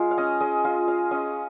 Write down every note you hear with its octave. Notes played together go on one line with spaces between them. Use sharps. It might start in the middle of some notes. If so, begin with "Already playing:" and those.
Already playing: G#3 F4
F5
C#4 D#5
G#3 D#5
F4 D#5
G#3 F5
C#4 D#5